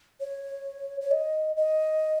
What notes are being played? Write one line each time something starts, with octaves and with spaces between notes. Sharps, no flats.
C#5
C#5
D#5
D#5